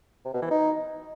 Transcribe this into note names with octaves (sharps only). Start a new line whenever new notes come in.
C3
B2
E3
D#4